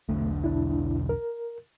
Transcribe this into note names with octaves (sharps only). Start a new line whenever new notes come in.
E1 B1 D3 A3
D4 E4
A#4